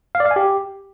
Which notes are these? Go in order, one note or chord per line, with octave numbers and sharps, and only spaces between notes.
F5
D5
F5
G#5
G4